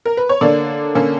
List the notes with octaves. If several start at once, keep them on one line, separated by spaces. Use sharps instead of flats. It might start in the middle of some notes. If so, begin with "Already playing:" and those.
A#4
B4
C#5
D3 A#3 D4 D5
D3 A#3 C#4